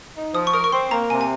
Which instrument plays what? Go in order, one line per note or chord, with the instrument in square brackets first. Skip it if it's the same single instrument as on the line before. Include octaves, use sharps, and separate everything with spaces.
[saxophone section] D#4
[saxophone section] F3 [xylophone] D#6
[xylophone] C#6
[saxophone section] A#4 [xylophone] D#6
[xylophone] C#6
[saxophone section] C4 [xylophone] C6
[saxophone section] A#3 [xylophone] A#5
[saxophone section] C3 [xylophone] G#5
[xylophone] G#5